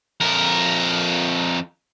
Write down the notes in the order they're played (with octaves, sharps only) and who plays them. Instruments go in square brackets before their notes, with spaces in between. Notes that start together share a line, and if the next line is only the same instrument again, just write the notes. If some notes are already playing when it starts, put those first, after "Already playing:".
[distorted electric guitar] F2 A#4